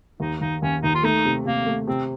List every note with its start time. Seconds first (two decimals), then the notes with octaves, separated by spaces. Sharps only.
0.20 D#2 D#4
0.41 D#2 D#4
0.61 D#2 C#4
0.83 D#2 D#4
0.95 F4
1.03 A3 D#4
1.25 C3
1.45 C3 A#3
1.66 A3
1.88 C3 C4